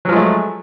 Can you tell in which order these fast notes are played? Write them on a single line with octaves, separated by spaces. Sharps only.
F#3 F3 G#3 A3